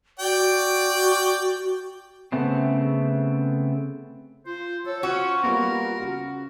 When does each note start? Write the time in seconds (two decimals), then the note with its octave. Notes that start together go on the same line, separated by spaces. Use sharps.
0.20 F#4 D5 G5
2.32 C#3 A3 B3 C4
4.46 F4 C5
4.86 A4 C#5
5.03 C#4 F4 F#4 C5
5.43 G3 A#3 B3 A#4
5.99 C#3 F#4